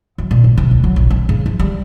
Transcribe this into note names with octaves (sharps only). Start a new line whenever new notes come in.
F#3
A#2
A#1
C3
D2
F#3
A#1
C4
C#3
F3
G3